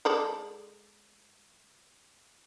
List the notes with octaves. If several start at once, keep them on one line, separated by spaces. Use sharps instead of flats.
G#3 A4 D5